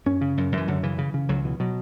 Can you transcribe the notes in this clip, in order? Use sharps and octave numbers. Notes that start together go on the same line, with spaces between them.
F#2 C#4
C#3
F#2
F#2
E3
F#2 D3
C#3 E3
C#3
C#3
C#2 F#3
B2 E3
B2 F#3